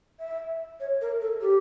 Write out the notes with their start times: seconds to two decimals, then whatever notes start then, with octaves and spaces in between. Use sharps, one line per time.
0.19 E5
0.80 C#5
1.01 A#4
1.21 A4
1.41 G4